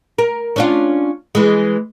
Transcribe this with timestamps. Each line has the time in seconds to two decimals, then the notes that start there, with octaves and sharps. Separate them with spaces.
0.18 A#4
0.56 C#4 D4 F4
1.35 E3 G#3